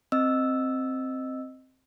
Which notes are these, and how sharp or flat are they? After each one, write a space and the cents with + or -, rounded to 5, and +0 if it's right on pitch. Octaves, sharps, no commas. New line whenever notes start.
C4 +0 D#5 +0 E6 +0